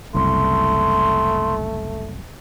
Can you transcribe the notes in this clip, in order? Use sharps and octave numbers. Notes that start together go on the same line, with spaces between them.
F#1 C2 A3 C6